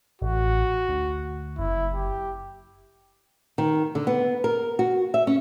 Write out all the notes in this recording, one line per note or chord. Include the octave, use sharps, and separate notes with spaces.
A1 F#4
D2
F#1 E4
G4
D#3
D3
B3
A#4
F#4
E5
C#4